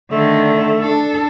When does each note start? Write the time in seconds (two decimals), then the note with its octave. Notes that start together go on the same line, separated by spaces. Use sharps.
0.11 D3 D#3 A3
0.81 D4 A4